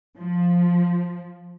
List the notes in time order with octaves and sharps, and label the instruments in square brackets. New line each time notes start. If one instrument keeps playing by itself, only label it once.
[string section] F3